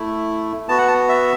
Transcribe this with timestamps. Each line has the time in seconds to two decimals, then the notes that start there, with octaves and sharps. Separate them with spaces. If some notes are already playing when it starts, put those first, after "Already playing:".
Already playing: A3 E4
0.68 B3 F#4 A5
0.78 F#5
0.88 A5
1.09 E5